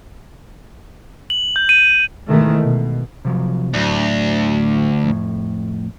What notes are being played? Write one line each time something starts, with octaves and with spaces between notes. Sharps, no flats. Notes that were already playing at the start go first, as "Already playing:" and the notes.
F#7
G6
D#7
G#2 B2 D#3 E3 G#3 A3
B2
C3 F3 F#3
D2 A2 F#3
F2 A2